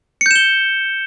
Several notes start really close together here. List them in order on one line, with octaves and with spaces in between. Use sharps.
C#7 G6 E7 G7